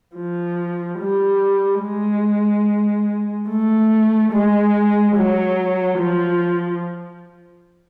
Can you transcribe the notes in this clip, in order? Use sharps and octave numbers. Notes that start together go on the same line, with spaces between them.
F3
G3
G#3
A3
G#3
F#3
F3